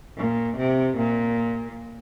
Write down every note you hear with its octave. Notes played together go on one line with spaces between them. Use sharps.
A#2
C3
A#2